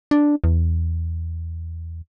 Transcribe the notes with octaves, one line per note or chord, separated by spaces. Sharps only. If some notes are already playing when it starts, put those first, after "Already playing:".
D4
E2